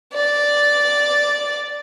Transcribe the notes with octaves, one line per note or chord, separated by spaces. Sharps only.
D5